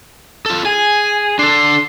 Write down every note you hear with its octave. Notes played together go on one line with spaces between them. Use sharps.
F4 A4
G#4 G#5
D4 A4 C6